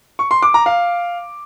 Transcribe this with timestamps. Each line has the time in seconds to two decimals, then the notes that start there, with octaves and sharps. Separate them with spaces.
0.19 C#6
0.31 C6
0.43 D6
0.54 A#5
0.66 F5